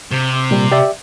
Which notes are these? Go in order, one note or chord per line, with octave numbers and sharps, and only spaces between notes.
C3
A#2 G3
G4 D5 E5